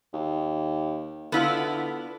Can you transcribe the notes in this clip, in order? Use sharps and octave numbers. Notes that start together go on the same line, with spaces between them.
D#2
D3 B3 E4 F4